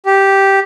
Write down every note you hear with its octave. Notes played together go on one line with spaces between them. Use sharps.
G4